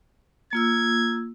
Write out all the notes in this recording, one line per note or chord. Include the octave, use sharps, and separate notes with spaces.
A#3 F4 E6 G#6